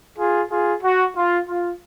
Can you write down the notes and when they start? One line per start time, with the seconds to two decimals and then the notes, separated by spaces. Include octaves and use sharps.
0.17 F4 G#4
0.50 F4 G#4
0.82 F#4
1.15 F4
1.47 F4